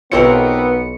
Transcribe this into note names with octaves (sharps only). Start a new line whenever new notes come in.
B1 B3 C4 F4 G4 A#4 C#5 C#7